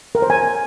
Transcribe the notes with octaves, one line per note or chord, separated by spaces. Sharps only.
A#4
C5
G#5